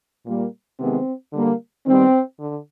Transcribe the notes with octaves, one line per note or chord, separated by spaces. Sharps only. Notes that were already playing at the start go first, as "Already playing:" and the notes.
A#2 G3 A#3
C3 D#3 G#3 B3 C4
D3 G3 A#3
D#3 G3 B3 C4
D3